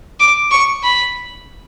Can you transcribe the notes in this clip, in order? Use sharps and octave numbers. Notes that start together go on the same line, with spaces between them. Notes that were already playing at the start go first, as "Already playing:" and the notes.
D6
C#6
B5